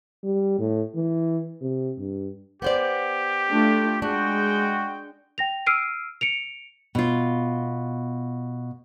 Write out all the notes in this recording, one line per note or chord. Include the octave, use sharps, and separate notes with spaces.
G3
A2
E3
C3
G2
B3 G4 C5 D5
A3 D4 F4
G#3 D4 F#4 G5
G5 A#6 F7
E6 F6 C7 D7 D#7
C#7 D7 F7
B2 F4